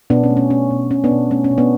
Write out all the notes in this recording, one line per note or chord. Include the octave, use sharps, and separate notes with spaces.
B2 B3 D4
C#4
A3
C#4
A3 C#4
B2
B2 C#4
B3 D4
B2
A3 C#4
C#4
B2
B3 D4